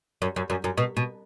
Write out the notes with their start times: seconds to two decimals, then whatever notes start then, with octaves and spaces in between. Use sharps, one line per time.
0.22 F#2
0.36 F#2
0.50 F#2
0.64 F#2
0.78 B2
0.97 B2